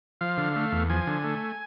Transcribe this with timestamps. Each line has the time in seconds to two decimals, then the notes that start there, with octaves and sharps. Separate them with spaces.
0.21 F3 F5
0.38 D3
0.56 A3
0.72 E2
0.90 F3 G#5
1.07 D3
1.24 A3